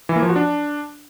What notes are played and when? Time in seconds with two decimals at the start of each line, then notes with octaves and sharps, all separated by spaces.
0.09 E3
0.16 A#3
0.22 F3
0.29 F#4
0.36 D4